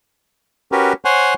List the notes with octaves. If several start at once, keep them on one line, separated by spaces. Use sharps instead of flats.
C#4 F#4 G4 A#4 B4
C5 C#5 F#5 G#5